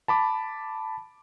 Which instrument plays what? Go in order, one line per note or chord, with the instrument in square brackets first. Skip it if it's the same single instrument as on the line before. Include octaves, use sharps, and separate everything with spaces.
[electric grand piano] A5 B5 D6